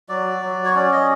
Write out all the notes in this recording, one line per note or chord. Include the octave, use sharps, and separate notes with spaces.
F#3 D5
F#3
C#5
C#4 D5
D#5